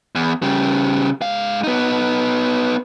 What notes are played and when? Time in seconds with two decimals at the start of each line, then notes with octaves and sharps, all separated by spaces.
0.15 E2
0.42 C#3 G3
1.22 G#2 F5
1.64 B3 D#4